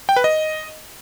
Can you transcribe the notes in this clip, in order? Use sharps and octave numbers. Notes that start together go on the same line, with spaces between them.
G5
B4
D#5